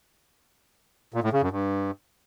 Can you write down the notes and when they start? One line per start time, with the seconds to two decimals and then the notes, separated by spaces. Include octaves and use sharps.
1.14 A#2
1.23 A2
1.33 C#3
1.42 F#2
1.51 G2